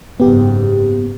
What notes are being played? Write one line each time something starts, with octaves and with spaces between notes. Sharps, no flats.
F#1 G#2 B3 G4